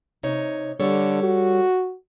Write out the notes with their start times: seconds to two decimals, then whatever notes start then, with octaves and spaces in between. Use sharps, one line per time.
0.23 C3 D#4 C#5
0.80 D3 G3 A4 C#5
1.23 F#4